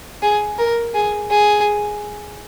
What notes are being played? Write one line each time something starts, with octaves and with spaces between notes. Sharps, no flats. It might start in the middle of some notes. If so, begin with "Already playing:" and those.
G#4
A#4
G#4
G#4